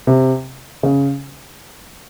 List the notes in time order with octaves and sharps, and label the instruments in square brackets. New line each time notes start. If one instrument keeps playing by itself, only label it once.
[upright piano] C3
C#3